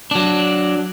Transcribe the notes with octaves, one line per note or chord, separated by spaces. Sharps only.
F#3 D4